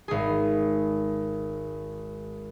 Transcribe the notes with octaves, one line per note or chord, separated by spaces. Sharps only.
G#1 G#4